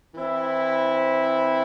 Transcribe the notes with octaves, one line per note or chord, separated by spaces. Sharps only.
E3 C4 E4